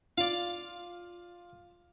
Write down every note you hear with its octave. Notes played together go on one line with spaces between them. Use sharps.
F4 D5 F5